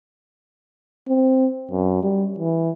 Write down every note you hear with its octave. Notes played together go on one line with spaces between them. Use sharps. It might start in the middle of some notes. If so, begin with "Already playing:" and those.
C4
F#2
G3
E3